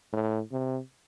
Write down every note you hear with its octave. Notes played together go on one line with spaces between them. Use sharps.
A2
C3